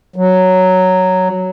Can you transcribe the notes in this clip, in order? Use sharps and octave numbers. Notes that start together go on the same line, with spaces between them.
F#3